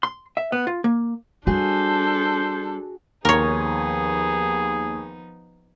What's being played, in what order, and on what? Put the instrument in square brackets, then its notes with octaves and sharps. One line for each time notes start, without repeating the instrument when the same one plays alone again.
[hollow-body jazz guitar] C6
E5
B3
F4
A#3
[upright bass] G3 [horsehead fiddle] D4 A4 [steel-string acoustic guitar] F#4 G#4 [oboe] C5
[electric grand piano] D#2 [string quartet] F3 B3 D#4 [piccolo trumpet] G#4 [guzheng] A#4 C#5